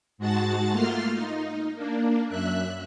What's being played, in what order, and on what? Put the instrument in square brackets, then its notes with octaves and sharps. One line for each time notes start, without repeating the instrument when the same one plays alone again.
[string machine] G#2 G#3 F#4 F#5 A5 A6
A3 A#3 F4 C6 F6
D#4
A#3 D4
F#2 E5 F#6